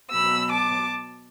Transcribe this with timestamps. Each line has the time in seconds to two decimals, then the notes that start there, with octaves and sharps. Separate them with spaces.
0.11 B2 F#3 B3 B5 E6
0.50 A5 D6